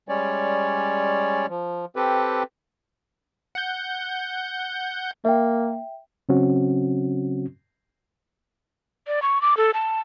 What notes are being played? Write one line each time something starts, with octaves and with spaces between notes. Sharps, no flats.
G3 G#3 C#4 C#5 D5
F3
C4 G4 A4 B4
F#5 G6
A#3 E5 G5
C#3 F#3 C4 C#4 F#4
D5
C#6
D6
A4
A5